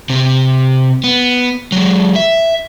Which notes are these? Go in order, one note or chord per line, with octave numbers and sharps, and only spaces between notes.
C3
B3
F#3 G#3
E5